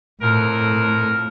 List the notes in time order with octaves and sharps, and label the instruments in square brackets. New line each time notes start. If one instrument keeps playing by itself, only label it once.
[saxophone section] F2 A#4 [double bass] A2